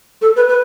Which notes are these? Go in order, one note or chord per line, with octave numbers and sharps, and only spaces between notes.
A4
B4
B4